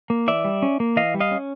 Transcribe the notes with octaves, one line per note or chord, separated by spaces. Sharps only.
A#3
E3 D5 E5
G3
C#4
A#3
E3 D#5 F5
G3
D#5 F5
C#4